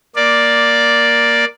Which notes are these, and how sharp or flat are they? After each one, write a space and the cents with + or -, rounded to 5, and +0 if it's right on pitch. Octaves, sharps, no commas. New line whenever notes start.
A#3 +10 D5 +0